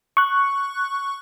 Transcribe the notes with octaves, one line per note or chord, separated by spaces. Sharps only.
C#6 F#6